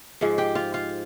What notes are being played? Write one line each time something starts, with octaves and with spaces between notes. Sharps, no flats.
G#2 F3 G#3
G4 G5
F4 F5
F4 F5